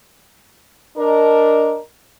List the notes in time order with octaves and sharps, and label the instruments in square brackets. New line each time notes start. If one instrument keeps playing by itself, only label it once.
[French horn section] D4 A#4 D#5